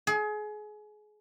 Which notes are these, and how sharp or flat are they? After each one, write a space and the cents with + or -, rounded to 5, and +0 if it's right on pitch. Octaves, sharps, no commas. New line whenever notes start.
G#4 +30